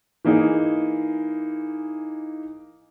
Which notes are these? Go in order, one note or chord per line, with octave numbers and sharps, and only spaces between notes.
E3 A#3 D#4 G#4